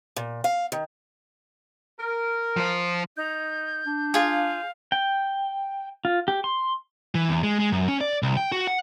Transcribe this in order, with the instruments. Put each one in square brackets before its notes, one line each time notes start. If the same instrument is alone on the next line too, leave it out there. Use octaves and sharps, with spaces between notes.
[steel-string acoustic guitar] A#2
F5
D#3
[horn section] A#4
[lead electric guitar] F3 C5
[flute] D#4 [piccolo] G6
[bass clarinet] D4
[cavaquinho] F4 G#4 [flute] F5
[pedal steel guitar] G5
F4
G4
C6
[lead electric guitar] E3
E2
G#3
G#3
F#2
C#4
D5
C2
G5
F#4
F#5